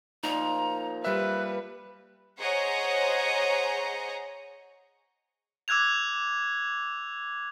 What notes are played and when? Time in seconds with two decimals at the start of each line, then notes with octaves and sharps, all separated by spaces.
0.23 A#2 F3 D#4 A#5
1.05 G3 B4 E5 F#6
2.39 G#4 C5 C#5 D#5 F#5 A#5
5.68 D6 E6 F#6 G#6 F7